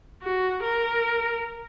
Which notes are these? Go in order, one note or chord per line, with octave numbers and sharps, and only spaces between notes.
F#4
A#4